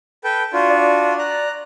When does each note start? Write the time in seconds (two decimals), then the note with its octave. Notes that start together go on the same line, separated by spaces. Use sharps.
0.24 A4 B4 G5
0.53 D4 F4 F#4
0.70 D5
1.19 A#5 F#6